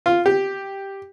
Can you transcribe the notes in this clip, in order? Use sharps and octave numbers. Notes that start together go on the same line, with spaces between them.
F4
G4